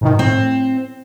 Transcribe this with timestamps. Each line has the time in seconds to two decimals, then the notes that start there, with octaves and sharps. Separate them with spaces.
0.01 G#2 B2 D#3
0.19 A2 C4